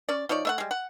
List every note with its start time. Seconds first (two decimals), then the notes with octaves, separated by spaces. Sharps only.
0.09 C#4 D5
0.29 F3 D#4 C#5 D5
0.45 A3 E5 F#5
0.58 G3 G#3
0.71 F#5